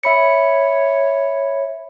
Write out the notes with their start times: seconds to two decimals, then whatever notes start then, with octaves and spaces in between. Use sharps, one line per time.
0.03 C#5 E5 B5 C#7